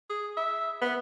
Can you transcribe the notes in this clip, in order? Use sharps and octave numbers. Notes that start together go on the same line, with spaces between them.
G#4
E5
B3